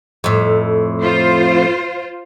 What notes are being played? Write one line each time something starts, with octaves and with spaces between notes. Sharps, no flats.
F2 A2
F4 C5